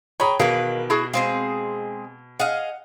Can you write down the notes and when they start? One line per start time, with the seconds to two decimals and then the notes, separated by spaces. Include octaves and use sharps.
0.20 G#4 C#5 G5 A#5 B5
0.40 B2 D#3 E3 G#4 A#4 B4 F5
0.90 E4 F#4 G#4
1.13 G#3 C4 G#4 F5
2.39 G#4 D#5 F5 F#5